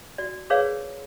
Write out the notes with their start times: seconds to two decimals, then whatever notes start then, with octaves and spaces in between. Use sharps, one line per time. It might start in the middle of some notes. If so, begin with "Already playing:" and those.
0.18 F#4 D5
0.50 G#4 A#4 B4 C#5 D5 F5